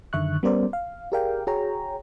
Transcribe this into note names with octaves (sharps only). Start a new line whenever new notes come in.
F#2 D3 D#3 E5 C#6 F#6
G3 B3 C#4 A#4 C5 D5
F5
G4 G#4 A#4 D5 F5 G5
F#4 G#4 C#5 G5 A#5